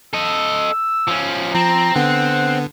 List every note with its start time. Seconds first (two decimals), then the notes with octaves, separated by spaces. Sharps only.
0.13 A4 D#5 E6
1.08 F3 C#4
1.55 F3 C4 A#5
1.96 D3 B3 F#5